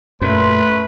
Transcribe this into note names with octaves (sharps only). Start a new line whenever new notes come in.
F#2 A#2 A3 B4 C6